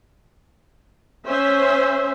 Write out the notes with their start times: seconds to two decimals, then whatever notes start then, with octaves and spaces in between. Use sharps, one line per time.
1.27 C#4 C5 E5